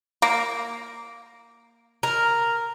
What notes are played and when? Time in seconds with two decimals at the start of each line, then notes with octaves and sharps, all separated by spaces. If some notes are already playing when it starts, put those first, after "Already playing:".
0.22 A#3
2.03 A#4